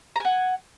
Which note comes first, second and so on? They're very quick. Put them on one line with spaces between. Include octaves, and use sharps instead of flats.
A#5 G#5 F#5